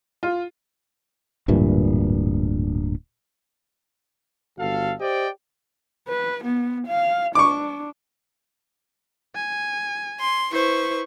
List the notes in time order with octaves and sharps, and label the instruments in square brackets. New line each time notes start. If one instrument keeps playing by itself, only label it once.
[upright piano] F4
[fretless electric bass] D1 G2 A#2 E3
[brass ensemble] G1 F#4 A4 F5
G4 C5 D5 D#5 G5
[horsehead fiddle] B4
B3
F5
[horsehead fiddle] D4 [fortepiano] C#6 D6
[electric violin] G#5
[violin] C6
[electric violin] E4 C5 [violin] B4 C#6